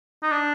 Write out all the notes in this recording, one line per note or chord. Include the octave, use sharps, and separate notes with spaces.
D#4
D4